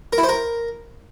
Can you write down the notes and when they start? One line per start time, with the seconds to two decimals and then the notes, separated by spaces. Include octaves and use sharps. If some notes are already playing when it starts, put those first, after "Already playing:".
0.13 A#4
0.18 E4
0.23 C5
0.29 A#4